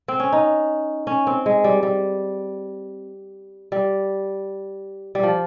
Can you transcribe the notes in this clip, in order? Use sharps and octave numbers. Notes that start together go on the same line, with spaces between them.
C4
C#4
D#4
C#4
C4
G#3
G3
G3
G3
G3
F3